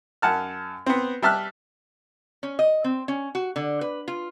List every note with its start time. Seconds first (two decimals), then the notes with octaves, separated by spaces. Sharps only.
0.22 F#2 F#5 A5 F6
0.86 B3 C4
1.22 G3 E5 A5 F6 F#6
2.43 C#4
2.59 D#5
2.84 C4
3.08 C#4
3.35 F#4
3.56 D3
3.81 B4
4.08 F4